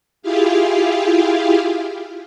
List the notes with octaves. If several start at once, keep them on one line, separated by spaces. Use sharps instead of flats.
E4 F4 G4 G#4 F5